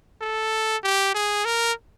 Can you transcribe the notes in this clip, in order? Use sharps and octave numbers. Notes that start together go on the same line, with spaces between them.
A4
G4
G#4
A#4